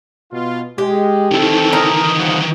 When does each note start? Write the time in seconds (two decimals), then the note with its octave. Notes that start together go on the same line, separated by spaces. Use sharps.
0.32 B2 F4
0.78 G#3 G4
1.32 D#3 E3 C4 A4
1.73 D#4 A#4
2.18 C2 F3 F#5